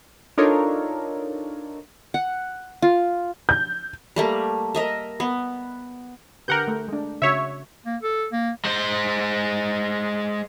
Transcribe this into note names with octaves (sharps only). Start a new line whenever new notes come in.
D4 D#4 F4 A4 A#4 C#5
F#5
F4
G6
G3 A3 A#3
A#4 D#5 E5
B3
D3 G4 A#4 B4 F#5 G6
A3
G#3 D4
C#3 F#4 C#5 E5
A#3
A4
A#3
G#3 C5